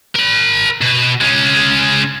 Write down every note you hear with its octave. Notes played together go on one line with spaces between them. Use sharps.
A#4 B5
B2
G#3 C#4